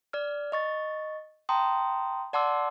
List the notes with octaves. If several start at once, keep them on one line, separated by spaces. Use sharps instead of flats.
D5 F6
D#5 C#6 A6
G5 A5 A#5 C6 D#6
D5 F#5 A5 C6 D6 E6